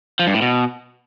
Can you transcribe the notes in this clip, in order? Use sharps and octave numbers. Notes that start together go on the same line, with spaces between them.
F3
G2
A2
B2